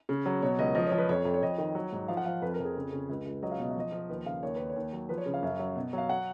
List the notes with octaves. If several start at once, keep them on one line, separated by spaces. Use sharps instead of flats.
C#3
F#3
B2 C#5
C#2 D#5
F3 D#5
C#5
F3
B4
F2 C#5
F2
C#5
F2 D#5
D#3
F#3
G#2
F3 F5
F#5
F3 F5
F2 B4
A#4
F2
G#4
C#3
C#3
C#2
C#2
F#3 D#5
F5
B2 D#5
F5
F3 D#5
F3
D#2 B4
C#3 F5
D#2 C#5
D#2 B4
C#5
D#2
F#3
F3 B4
C#5
C#3
F5
F#2
F#3
B2
F#3 F5
F#5